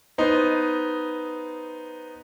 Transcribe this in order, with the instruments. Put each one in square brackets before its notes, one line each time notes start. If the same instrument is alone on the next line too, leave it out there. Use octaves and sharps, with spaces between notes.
[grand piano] B3 D#4 C5